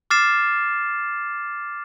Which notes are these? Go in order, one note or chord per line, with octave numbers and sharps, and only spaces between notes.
D6 F6 A6 C7 E7